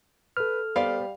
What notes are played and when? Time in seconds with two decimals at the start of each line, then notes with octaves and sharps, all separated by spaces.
0.37 A4 B4 F6
0.76 G3 B3 C5 D5 F5